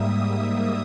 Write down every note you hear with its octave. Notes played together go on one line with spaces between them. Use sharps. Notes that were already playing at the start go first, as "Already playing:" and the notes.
Already playing: G#2 G3 A#3 E5 D#6
D#6
D#6